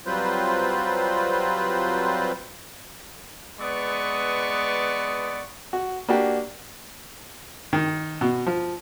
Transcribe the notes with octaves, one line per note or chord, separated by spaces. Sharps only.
F#3 G3 C4 F4 B4 C5
G#3 B3 B4 D5 C#6 D#6
F#4
A#3 D4 F#4 G4
D#3
B2
F3